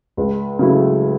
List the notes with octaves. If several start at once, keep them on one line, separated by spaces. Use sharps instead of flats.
C#2
C#3 F#3 A3 E4